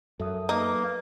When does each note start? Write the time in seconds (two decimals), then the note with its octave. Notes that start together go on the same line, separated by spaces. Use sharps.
0.20 F#2 A4 E5 D#6
0.49 A#3 D#4 B4